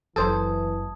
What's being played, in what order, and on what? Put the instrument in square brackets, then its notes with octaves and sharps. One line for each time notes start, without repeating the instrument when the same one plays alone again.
[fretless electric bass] F#1 F#2 [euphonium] E3 [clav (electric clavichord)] A4 C5 [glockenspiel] A5 D#6 G#6